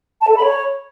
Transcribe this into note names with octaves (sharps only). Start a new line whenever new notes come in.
A5
A4
B5
C#5